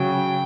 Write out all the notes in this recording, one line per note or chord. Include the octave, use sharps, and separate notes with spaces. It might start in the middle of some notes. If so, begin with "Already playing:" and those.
Already playing: C#3 F#3 G5